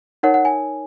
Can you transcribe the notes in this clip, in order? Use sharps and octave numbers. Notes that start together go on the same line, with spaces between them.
D#4 A#4 C#5 F#5
F#5
G#5